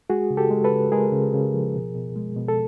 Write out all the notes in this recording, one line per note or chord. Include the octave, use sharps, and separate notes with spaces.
G#3 F#4 G#4
C#3
G4 A4
G#3
A4 B4
C#3
G#3 G#4 A#4
C#3
C#3
F3
B2
B2
G#3
B2
A4